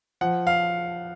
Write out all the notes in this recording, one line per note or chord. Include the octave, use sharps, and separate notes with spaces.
F3 F#5
F5